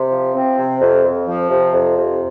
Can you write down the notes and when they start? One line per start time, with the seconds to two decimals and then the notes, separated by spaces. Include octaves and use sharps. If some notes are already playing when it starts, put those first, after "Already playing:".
Already playing: C3
0.11 F3
0.34 C4
0.57 C3
0.80 F2
1.04 F2
1.26 F3
1.50 C3
1.73 F2
1.95 C3